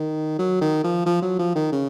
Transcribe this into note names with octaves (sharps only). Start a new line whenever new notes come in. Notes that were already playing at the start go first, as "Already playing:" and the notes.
Already playing: D#3
F#3
D#3
F3
F3
F#3
F3
D#3
C#3